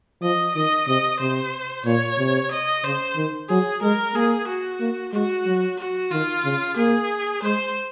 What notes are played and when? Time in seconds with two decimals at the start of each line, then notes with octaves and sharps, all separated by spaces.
0.22 F3 D#5
0.55 D#3 D#5
0.88 C3 D#5
1.20 C3 C5
1.85 A#2 C#5
2.19 C3
2.52 D#5
2.84 C#3 C5
3.16 D#3
3.49 F#3 G#4
3.82 G#3 A#4
4.15 A#3 G#4
4.48 F#4
4.80 A#3
5.13 G#3 F#4
5.46 F#3
5.79 F#4
6.11 D#3 F4
6.45 C#3
6.77 A#3 G#4
7.43 G#3 C5